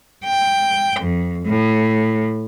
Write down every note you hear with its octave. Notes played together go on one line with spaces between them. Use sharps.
G5
F2
A2